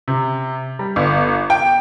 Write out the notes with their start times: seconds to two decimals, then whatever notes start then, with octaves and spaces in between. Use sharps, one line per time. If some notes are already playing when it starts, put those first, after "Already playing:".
0.08 C3
0.79 G3
0.96 G1
1.50 G5